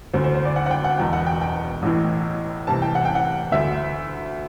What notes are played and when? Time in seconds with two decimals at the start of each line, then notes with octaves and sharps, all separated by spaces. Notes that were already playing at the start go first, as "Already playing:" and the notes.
0.13 D2 D3 C5
0.24 C5
0.35 C5
0.45 D5
0.56 F#5
0.66 F#5
0.71 G5
0.84 F#5
0.98 E1 E2 B2 G5
1.13 F#5
1.26 G5
1.41 G5
1.82 A1 A2 E3
2.67 C2 C3 E3 A5
2.82 G5
2.95 F#5
3.05 G5
3.15 F#5
3.52 D2 D3 E5